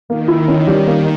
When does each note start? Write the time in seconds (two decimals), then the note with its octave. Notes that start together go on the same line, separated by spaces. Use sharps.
0.09 D#3 A#3
0.28 E4
0.48 C#4
0.67 G3
0.87 A#3